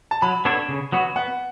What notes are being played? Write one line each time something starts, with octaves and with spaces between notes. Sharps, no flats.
A5
F#3 B5
B3 D4 A4 C#5
C#3
F#3 B3 F#4
B3 F#5